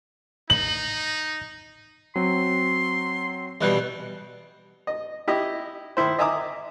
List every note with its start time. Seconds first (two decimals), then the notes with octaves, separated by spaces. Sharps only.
0.50 D#4 F#7
2.16 F#3 C4 C6
3.61 B2 E3 G3 D#5 F#6 G6
4.87 D#5
5.28 E4 G4 D#5
5.97 D#3 E4 C5
6.18 D#5 E5 G#5 A#5 D6 D#6